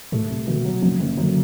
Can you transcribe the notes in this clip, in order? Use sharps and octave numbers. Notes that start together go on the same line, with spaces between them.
A2 A3
C2
B2 D3
F#3
F#1 E3
F#1 D3
F#2 D3